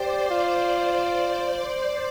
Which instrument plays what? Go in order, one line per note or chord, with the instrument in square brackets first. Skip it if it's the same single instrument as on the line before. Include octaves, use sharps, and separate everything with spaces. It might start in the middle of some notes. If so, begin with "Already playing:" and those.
Already playing: [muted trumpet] G4 [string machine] C5 D5
[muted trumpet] F4 [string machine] D5